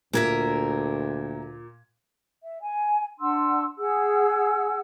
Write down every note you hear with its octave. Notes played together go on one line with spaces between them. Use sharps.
D2 A#2 A#3 A#4 E5 G#6
E5
G#5
D4 F#5 C6 E6
G#4 F#5 E6